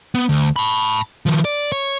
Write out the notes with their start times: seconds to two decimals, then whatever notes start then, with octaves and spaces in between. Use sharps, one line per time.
0.14 B3
0.29 D2
0.56 A5 B5
1.26 D#3 F3
1.45 D5
1.72 C#5